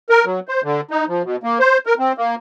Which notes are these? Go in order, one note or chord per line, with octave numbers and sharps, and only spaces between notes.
A#4
F#3
C5
D3
D#4
F3
B2
A#3
C5
A#4
C4
A#3